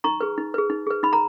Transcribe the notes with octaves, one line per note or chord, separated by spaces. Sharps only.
D#4 A#5 C#6
G#4 B4
D#4
G#4 B4
D#4
G#4 B4
D#4 B5
A#5